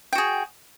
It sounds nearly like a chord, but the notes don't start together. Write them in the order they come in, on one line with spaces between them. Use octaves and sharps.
G5 F#4 G#4